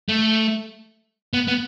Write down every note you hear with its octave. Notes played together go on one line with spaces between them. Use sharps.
A3
B3
B3